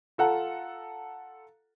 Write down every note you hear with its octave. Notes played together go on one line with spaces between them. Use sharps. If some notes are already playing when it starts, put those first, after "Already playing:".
F4 A4 F#5 A#5